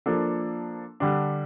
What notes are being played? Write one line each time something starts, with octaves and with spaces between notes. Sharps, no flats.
F3 A#3 D4 A4
D3 G3 D4